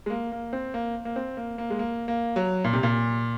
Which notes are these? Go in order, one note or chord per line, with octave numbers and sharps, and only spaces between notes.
G#3
A#3
A#3
C4
A#3
A#3
C4
A#3
A#3
G#3
A#3
A#3
F#3
A#2
C3
A#2